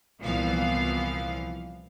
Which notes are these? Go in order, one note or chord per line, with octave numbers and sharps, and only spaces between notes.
C2 A#2 E3 F3 B3 F5